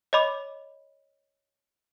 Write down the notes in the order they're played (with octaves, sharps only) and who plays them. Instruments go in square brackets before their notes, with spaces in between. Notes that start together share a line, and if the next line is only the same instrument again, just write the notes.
[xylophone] C#5 D#5 B5 D6